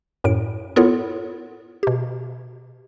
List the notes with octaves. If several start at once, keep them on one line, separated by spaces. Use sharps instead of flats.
F#2 A2 D7
B3 E4 F4 A4 A#4 C#5
B2 G4